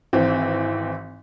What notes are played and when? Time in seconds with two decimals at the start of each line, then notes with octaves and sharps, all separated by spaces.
0.13 G#1 E3 C4